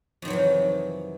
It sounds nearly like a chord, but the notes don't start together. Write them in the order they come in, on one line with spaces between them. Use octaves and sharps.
F2 D#3 F#3 E3 C3